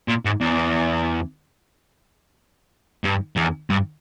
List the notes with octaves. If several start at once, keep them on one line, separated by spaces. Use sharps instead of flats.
A#2
G#2
E2
G2
E2
G2